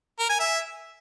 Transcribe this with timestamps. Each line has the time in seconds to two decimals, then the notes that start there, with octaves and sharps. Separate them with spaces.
0.19 A#4
0.29 G#5
0.39 E5